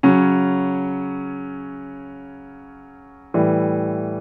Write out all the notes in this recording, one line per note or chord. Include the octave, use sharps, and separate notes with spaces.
C#3 F#3 C#4
A2 E3 G3